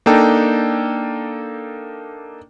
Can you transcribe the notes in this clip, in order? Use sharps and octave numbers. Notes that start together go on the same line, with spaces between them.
A#3 D4 D#4 A4 G5